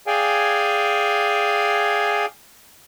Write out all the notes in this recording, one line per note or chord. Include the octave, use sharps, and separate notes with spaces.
G#4 D5 F5 G5 G#5